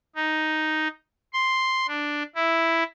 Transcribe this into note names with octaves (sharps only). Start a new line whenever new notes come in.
D#4
C6
D4
E4